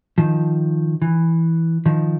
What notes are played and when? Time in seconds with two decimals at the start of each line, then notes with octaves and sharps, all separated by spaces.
0.18 D#3 F3
1.02 E3
1.86 D#3 F3